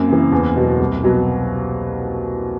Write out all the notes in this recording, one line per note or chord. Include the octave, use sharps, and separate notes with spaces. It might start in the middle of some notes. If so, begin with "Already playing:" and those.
Already playing: F#2 A#3 C4
C#3 E3
E2
B2 F#3
C2
B2 F#3